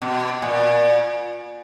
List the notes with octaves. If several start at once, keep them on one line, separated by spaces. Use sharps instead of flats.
B2
A#2